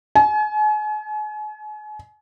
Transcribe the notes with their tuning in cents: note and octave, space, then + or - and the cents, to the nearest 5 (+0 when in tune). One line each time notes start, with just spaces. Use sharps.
G#5 +40